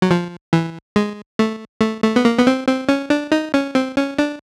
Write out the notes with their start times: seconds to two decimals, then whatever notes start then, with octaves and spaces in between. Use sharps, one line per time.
0.02 F#3
0.11 F3
0.53 E3
0.96 G#3
1.39 A3
1.81 A3
2.03 A3
2.16 B3
2.25 A#3
2.39 B3
2.47 C4
2.67 C4
2.89 C#4
3.10 D4
3.32 D#4
3.54 C#4
3.75 C4
3.97 C#4
4.19 D4